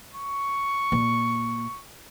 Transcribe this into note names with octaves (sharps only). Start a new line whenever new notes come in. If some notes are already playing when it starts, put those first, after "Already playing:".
C#6
A#2